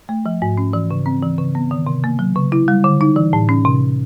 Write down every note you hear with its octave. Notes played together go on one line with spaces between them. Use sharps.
A3
F3
G#2
C#4
E3
C#3
C4
E3
C#3
B3
D#3
C3
A#3
F#3
C#3
E4
G3
D3
D#4
E3
A2
C#4
C3